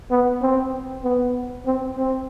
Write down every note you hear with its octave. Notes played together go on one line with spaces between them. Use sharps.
B3
C4
B3
C4
C4